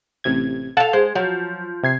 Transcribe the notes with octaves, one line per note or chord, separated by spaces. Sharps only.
A1 C3 G#6
A4 F5 F#5 A5
G#3 C5
F3 F#3
C3 G#6 C7